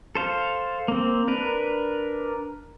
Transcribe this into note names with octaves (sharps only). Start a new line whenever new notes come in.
A4 C5 F5
A#3 C4
D4 A#4 B4